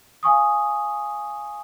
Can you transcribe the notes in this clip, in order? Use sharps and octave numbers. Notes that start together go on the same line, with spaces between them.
F5 G#5 C#6 D#6